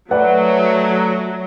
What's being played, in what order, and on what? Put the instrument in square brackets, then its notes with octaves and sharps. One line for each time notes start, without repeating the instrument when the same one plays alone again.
[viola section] F#3 [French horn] A3 [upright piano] B4 D5 F#5